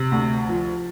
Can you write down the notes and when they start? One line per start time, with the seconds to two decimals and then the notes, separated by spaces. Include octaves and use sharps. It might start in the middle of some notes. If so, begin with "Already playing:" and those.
Already playing: C3
0.12 D2
0.49 F3